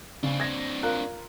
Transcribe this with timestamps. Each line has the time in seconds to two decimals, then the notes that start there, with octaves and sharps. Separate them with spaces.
0.23 C#3 C4 D4
0.40 G#6 A#6
0.83 F4 A#4 F#6